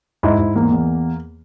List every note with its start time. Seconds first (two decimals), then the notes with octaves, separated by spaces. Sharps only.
0.23 G#2 E4
0.39 G#2
0.55 E2 A#3
0.72 E2